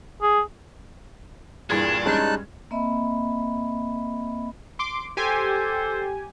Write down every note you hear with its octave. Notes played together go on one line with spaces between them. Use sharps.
G#4
G2 A#2 E3 D4 G#4 G#6
G3 G#3 C#4 D#4 A5 F#6
A#3 C4 D#5 E5 B5
C6 D6 D7
G4 A4 C5 G#5